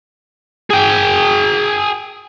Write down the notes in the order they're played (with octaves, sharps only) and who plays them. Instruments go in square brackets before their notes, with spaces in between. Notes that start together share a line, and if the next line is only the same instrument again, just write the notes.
[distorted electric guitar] G#4 G5